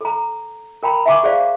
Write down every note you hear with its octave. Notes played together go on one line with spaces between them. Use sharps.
A4 A#5
A#4 G5 A#5 B5
E5 F#5 G#5 C#6 D6
G#4 C5 D5 F5